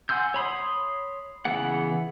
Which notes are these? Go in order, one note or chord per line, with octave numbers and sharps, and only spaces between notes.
F#5 G#5 C6 E6 G6
C#5 B5 C6 D#6
C#3 E3 B3 G#4 F#5